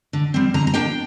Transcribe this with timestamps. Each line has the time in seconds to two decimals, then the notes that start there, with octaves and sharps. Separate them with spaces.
0.13 D3
0.34 G3 C4
0.54 D3 A#5
0.67 A#5
0.74 A#3 D4 G5